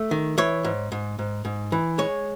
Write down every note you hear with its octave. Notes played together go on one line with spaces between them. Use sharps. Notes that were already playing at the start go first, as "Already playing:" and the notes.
Already playing: A3
D#3
E3 C#5
G#2
G#2
G#2
G#2
E3
G#3 C#5